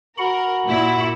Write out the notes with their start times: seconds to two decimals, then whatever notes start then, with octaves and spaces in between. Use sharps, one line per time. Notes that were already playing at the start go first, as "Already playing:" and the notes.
0.18 F#4 A#4 F#5 B5
0.66 A#2 E4